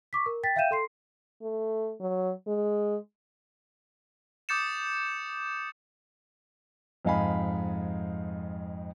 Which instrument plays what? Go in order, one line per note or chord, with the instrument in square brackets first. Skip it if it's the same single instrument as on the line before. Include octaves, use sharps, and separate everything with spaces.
[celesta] C#6 D6 B6
A#4
G5 A6 B6
E5 F5 G5 G6 D#7 E7
A4 C6 C7
[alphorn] A3
F#3
G#3
[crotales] D6 D#6 G6 A6 C#7 E7
[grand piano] F2 G#2 D#5 F5 G#5 B5